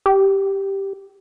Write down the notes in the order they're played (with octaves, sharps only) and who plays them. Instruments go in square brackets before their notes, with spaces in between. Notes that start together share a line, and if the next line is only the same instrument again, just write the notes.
[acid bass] G4